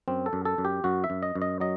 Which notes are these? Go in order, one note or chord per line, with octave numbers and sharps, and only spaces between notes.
F#2 C4
A4
F#2
A4
F#2
G4
F#2 F#4
E5
F#2
D#5
F#2
D#5
F#3 D#5